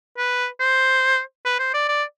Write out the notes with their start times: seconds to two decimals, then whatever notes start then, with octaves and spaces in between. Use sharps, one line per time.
0.18 B4
0.60 C5
1.46 B4
1.59 C5
1.74 D5
1.89 D5